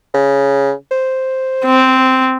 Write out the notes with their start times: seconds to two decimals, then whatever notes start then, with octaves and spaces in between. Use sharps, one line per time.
0.14 C#3
0.91 C5
1.65 C4